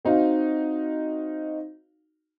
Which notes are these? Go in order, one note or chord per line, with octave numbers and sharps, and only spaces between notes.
C4 D#4 F#4 F5